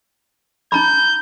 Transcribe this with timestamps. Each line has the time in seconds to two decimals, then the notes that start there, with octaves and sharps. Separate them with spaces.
0.72 D#4 A#5 B5 G6